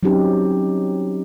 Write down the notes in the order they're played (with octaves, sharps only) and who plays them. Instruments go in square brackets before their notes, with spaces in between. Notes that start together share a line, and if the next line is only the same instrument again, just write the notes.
[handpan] F#3 C4 C#4 D#4 G4